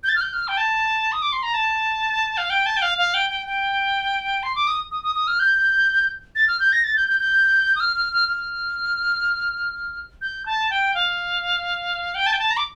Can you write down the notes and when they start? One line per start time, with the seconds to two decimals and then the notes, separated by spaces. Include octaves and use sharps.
0.04 G6
0.09 A6
0.16 F6
0.21 G6
0.33 F6
0.48 G5
0.57 A5
1.12 D#6
1.22 D6
1.33 C6
1.43 A#5
1.54 A5
2.37 F5
2.50 G5
2.66 A5
2.77 G5
2.82 F5
2.98 F5
3.14 G5
3.30 G5
3.46 G5
4.43 C6
4.55 D6
4.67 D#6
4.91 D#6
5.04 D#6
5.15 D#6
5.27 F6
5.40 G6
6.35 A6
6.48 F6
6.60 G6
6.72 A#6
6.84 A6
6.97 G6
7.08 G6
7.20 G6
7.76 D#6
7.80 F6
7.96 F6
8.13 F6
8.29 F6
10.22 G6
10.46 A5
10.70 G5
10.95 F5
12.15 G5
12.26 A5
12.33 G5
12.39 A5
12.51 A#5
12.57 D6